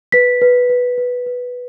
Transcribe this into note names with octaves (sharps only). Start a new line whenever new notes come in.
B4 B6
B4
B4
B4
B4